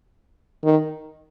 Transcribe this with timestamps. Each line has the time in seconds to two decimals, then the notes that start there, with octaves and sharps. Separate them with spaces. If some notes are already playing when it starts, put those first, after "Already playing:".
0.64 D#3